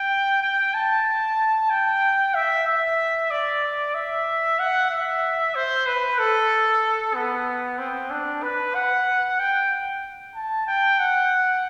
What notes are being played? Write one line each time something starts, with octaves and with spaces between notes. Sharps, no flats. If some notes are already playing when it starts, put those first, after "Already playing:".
Already playing: G5
G5
A5
G5
E5
E5
D5
E5
F#5
E5
C5
B4
A4
B3
C4
D4
B4
F#5
G5
A5
G5
F#5